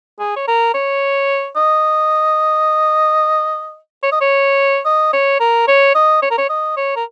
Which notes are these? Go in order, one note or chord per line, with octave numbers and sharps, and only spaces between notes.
G#4
C#5
A#4
C#5
D#5
C#5
D#5
C#5
D#5
C#5
A#4
C#5
D#5
C#5
A#4
C#5
D#5
C#5
A#4